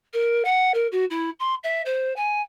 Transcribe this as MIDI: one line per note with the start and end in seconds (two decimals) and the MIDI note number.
0.13 0.43 70
0.45 0.72 78
0.74 0.87 70
0.92 1.04 66
1.10 1.30 64
1.39 1.55 84
1.63 1.82 76
1.85 2.15 72
2.16 2.41 80